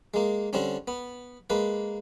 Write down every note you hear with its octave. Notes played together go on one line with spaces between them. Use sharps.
G#3 A#3
D3 G3 C4 C#4
B3
G#3 A#3 B4